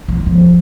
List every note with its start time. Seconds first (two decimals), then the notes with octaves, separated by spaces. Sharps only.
0.08 G#3
0.26 F3